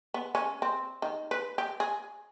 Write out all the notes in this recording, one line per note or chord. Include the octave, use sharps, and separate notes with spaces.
B3
C#4
C4
D#3
B4
G4
G#4